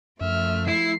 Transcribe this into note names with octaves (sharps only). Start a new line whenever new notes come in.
F#2 F3 A3 E5 F6
E4 C7